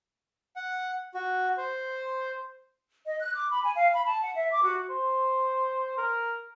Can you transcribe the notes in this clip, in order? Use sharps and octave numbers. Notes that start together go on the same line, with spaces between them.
F#5
F#4
C5
D#5
F#6
D6
B5
G#5
F5
B5
A5
F#5
E5
D6
F#4
C5
A#4